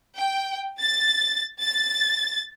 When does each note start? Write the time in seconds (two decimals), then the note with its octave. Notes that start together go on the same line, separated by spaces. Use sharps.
0.17 G5
0.79 A6
1.61 A6